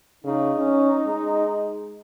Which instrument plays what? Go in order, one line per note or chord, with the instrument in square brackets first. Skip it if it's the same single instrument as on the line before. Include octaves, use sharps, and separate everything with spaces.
[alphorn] C#3 [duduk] D#4
[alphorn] C#4
G#3